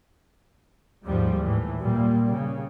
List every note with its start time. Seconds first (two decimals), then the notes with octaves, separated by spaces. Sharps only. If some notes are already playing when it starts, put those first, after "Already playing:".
1.06 D#2 G#2 F3 G3 G#3
1.41 A2 E3
1.79 A#2 G3 A#3
2.33 C#3